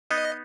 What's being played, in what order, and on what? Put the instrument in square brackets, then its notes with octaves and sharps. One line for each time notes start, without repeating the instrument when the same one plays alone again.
[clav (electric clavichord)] B3 D#4 [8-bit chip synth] D#5